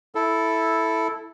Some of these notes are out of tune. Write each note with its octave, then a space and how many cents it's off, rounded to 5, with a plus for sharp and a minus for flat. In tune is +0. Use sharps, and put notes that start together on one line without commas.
E4 +0 A4 +0